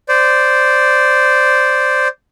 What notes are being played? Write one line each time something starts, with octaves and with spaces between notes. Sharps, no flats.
C5 D5